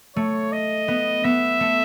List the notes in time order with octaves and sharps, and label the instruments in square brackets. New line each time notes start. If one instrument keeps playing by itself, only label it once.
[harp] A3 [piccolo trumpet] C#5
[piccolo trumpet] D#5
[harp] B3
[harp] B3 [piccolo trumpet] E5
[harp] A3